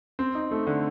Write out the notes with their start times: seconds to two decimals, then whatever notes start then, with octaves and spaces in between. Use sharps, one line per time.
0.19 C4
0.35 D#4
0.51 A3
0.67 D3